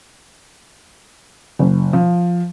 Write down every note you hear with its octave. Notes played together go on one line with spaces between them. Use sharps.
F#1
F3